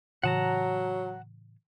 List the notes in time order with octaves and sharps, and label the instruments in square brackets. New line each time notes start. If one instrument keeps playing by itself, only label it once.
[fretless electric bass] A2 C#3 E3 [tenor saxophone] F#3 [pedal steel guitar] F#5 A5 A#5